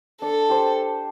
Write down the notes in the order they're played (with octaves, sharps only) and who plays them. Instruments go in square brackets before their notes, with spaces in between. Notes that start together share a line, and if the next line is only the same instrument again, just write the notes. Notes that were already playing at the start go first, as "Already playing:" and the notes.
[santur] D4 [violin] A4
[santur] G4 C5